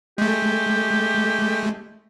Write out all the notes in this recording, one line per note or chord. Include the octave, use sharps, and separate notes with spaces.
G#3 A3 G4